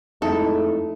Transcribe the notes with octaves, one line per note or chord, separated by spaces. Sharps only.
F2 G#3 A3 D#4 E4 A4